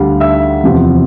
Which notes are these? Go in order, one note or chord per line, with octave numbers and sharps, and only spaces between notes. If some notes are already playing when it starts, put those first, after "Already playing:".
Already playing: D2 D3 G3 F5
E5 E6
E2 C3 F3